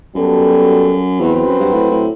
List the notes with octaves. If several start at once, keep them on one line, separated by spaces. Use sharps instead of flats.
F#2 G3 B3 F#4 A4
E2 F#3 C4 F#4 B4
E2
F#2
G2
A2
A2